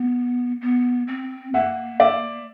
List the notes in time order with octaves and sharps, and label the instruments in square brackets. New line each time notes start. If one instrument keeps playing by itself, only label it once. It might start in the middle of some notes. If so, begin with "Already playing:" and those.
Already playing: [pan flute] B3
B3
C4
[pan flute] A#3 [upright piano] E5 F#5
[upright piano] D5 E5